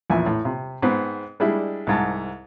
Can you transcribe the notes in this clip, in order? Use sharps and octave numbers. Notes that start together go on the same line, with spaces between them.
A#1 E2 E4 G#5
A2
C3
G#2 B3 C4
G3 G#3 D4 E4
C2 G#2 A5